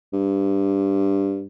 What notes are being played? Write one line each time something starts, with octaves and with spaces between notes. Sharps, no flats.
G2